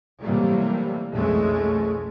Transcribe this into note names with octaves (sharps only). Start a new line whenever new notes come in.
C3 E3 F#3 G3 A3 A#3
B1 F2 E3 G#3 A3 C#4